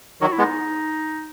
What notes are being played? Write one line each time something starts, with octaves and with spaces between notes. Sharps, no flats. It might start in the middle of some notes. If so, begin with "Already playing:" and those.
D#3 F#3 F#4
E4
G#3 B3
D#4